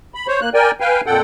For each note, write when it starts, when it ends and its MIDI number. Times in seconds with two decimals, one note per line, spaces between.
0.15 0.27 83
0.28 0.40 72
0.28 0.40 73
0.41 0.50 58
0.41 0.50 90
0.54 0.71 70
0.54 0.71 74
0.54 0.71 79
0.54 0.71 80
0.80 1.01 71
0.80 1.01 77
0.80 1.01 79
0.80 1.01 80
1.06 1.22 41
1.06 1.22 46
1.06 1.22 69
1.06 1.22 78
1.06 1.22 79